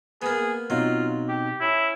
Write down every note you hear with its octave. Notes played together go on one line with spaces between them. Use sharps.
A#3 B3 G#4
B2 F#3 C4 D#4 F4
G4
C#4 E4